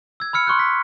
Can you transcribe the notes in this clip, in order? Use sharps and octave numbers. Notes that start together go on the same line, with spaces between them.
E6 G#6
B5 E6 F6 C#7
C6 C#6 E6 F#6
B6